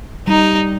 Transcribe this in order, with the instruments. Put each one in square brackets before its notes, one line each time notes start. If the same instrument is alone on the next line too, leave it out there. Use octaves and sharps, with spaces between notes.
[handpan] G3 [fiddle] D#4